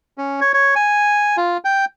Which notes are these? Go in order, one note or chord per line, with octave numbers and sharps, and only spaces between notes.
C#4
C#5
C#5
G#5
F4
G5